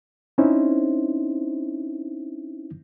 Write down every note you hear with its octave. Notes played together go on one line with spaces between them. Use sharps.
C4 C#4 D#4 E4 C5